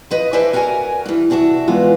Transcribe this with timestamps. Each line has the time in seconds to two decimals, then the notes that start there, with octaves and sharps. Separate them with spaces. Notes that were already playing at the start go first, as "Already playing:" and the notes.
0.11 F3 B4 D#5
0.33 A4 B4 C5 D5 E5 G#5
0.53 F#4 A#4 D5 F#5 G#5 A#5
1.06 G2 E3
1.30 C3 D4 F#4 C#5 E5
1.68 E3 G#3 B3 F4